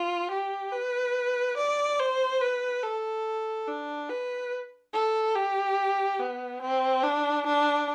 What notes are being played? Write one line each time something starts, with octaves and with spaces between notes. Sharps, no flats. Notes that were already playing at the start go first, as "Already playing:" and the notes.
Already playing: F4
G4
B4
D5
C5
B4
A4
D4
B4
A4
G4
B3
C4
D4
D4